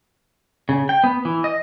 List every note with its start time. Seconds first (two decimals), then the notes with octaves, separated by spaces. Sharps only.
0.69 C#3
0.89 G5
1.04 B3
1.25 E3
1.44 D#5